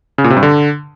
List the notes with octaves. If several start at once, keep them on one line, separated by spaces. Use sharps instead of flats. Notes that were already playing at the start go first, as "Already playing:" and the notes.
C#3
A#2
C3
G2
D3